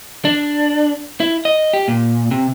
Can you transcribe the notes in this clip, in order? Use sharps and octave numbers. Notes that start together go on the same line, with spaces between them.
D4
E4
D#5
G4
A#2
C3